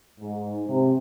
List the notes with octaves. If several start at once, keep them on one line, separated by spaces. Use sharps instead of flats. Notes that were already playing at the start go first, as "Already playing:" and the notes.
G#2
C3